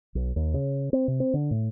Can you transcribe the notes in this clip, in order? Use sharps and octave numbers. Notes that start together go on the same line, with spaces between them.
B1
D#2
C#3
C4
C3
C4
D3
A2